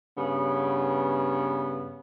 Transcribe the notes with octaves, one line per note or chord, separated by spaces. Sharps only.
G2 C#3 B3